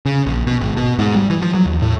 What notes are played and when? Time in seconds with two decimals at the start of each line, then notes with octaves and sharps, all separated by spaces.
0.06 C#3
0.26 A#1
0.47 B2
0.61 G#1
0.76 B2
0.99 G#2
1.15 G3
1.30 E3
1.42 F3
1.54 F#3
1.66 D#2
1.82 A2